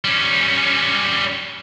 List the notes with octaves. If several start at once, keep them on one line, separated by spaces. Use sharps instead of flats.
G3 C#4